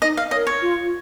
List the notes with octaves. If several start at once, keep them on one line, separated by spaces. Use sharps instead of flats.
D#4 D#5
F5
A#4 C#5 D#5
C#5
F4